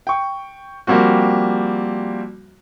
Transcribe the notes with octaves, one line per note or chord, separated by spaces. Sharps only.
G5 C#6
F3 G3 A#3 C4 F#4